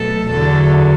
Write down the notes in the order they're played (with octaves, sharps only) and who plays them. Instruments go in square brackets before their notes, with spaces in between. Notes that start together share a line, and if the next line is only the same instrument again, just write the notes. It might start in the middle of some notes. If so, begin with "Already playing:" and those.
Already playing: [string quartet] B2 F#3 A3 A4
E2 D3 F#3 A4